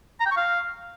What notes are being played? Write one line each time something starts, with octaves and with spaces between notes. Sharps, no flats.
A#5
G5
C#6
F5